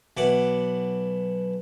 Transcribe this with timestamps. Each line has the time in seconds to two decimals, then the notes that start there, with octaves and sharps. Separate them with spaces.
0.17 B1 E3 F#5 D6